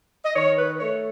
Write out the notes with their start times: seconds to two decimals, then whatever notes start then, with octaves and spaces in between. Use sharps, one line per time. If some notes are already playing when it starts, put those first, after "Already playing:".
0.24 D#5
0.35 D#3 C#5
0.57 B4
0.80 A3 C#5